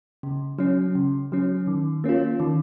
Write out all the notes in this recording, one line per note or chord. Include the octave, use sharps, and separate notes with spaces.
C#3
F#3 C#4
C#3
F#3 C#4
D#3
A#3 C#4 F4
D#3